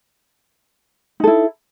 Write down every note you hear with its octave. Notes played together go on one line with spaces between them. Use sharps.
D#4 E4 A4